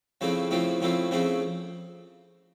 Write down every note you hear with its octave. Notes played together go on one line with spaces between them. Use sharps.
C#3 F3 A3 C4 E4
C#3 F3 A3 C4 E4
C#3 F3 A3 C4 E4
C#3 F3 A3 C4 E4